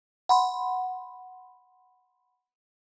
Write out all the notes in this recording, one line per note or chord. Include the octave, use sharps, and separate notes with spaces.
F#5 B5 C6